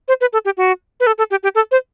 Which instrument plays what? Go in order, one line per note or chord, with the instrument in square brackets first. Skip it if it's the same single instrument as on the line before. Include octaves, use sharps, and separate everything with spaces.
[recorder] C5
B4
A4
G4
F#4
B4
A4
A4
G4
G4
A4
C5